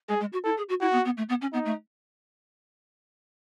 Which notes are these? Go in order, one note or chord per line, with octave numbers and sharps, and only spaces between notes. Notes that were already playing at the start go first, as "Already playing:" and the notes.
G#3 G#4
G#3
F#4
E4 A4
G#4
F#4
E4 F#4
B3
B3
A3
B3
C#4
B3 D#4
A3